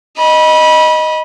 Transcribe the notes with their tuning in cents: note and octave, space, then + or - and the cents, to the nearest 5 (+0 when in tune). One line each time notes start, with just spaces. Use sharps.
D#5 +0 B5 -25